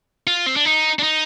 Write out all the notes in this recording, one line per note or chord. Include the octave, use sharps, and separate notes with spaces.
F4
C4
D4
D#4
D4
D#4